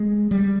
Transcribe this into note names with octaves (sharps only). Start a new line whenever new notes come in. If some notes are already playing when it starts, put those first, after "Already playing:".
Already playing: G#3
G3